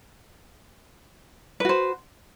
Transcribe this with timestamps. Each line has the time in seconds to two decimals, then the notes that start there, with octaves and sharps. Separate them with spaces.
1.60 B4
1.65 F#4
1.69 C5